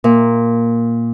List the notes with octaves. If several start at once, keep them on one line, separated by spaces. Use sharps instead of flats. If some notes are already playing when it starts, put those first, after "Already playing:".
A#2